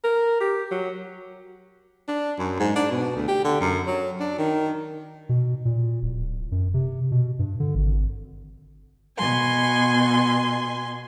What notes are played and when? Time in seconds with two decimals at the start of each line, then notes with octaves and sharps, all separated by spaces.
0.04 A#4
0.41 G4
0.72 F#3
2.08 D4
2.38 F#2
2.59 G#2
2.76 D4
2.91 B2
3.15 D2
3.28 G4
3.44 D3
3.61 F#2
3.87 F#3
4.20 D4
4.38 D#3
5.29 B2
5.65 A#2
6.02 D1
6.52 F#2
6.74 C3
7.11 B2
7.39 G2
7.60 D3
7.75 G#1
9.17 B2 G#5 C6